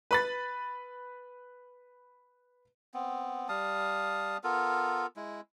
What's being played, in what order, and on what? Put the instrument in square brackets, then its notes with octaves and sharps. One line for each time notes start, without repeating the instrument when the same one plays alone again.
[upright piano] B4 B5 A6
[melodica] B3 C4
G3 F5 A5 D#6
B3 F4 A4 A#4
G#3 E4